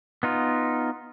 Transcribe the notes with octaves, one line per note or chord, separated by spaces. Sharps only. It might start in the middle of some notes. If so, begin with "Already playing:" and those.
B3 D#4 F4